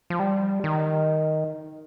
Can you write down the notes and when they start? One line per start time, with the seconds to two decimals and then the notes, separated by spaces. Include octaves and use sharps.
0.10 F3
0.19 G3
0.64 D#3